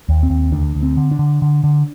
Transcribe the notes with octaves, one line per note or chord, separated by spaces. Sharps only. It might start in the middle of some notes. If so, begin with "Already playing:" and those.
D#2
C4
D#2
D2 D4
D2
C4
D3
D4
D3
D3
D3